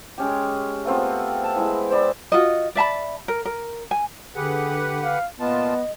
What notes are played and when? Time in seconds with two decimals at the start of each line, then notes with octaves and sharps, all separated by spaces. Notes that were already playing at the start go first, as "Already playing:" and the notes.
0.18 G#3 C#4 G4
0.85 A3 B3 C4 F4
1.44 A5
1.56 E3 G#3 E4
1.90 C5 D5 B5
2.32 F4 F#4 D#5
2.75 D5 E5 A5 B5
3.28 A#4
3.45 A#4
3.91 G#5
4.35 D3 G4 G#4 B4 F#5
5.04 F5
5.40 A#2 B3 F4 D#5 A5